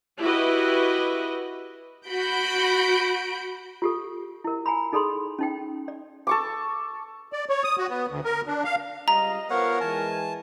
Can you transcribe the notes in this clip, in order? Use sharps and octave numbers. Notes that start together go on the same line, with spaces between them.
E4 F#4 G4 B4 D#5
F#4 B5 G6 D7
F4 G4 A4
E4 A#4
G#5 A#5 B5
D#4 G#4 A4 D5 B5 C6
C#4 D#4 G5
D5
A4 C#6 D6
D5
C#5
D#6
F#4
B3
D2
A#4
D4
F5
C#2 G3 D#5 F5 A#5
B3 F4 A#4 C5 C#5 F5 F#5
E3 G#3 G#5 A5